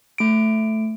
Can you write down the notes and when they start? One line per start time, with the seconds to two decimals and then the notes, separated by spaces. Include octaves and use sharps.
0.18 A3 D7